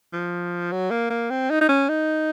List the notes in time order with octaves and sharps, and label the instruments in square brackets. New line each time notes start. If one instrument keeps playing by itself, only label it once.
[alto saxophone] F3
F#3
A#3
A#3
C4
D#4
D#4
C#4
D#4